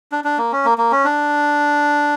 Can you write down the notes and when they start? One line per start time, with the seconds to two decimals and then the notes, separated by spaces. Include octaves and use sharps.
0.12 D4
0.24 D4
0.38 A#3
0.52 C#4
0.65 A#3
0.78 A#3
0.92 C#4
1.05 D4